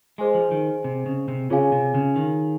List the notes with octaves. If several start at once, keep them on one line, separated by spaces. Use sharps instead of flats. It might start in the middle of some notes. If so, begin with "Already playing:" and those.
G#3 G#4 C5 D#5 G#5 C6
F3
D#3
C3
C#3
C3
C#3 F4 G#4 C#5 F5 G#5
C3
C#3
D#3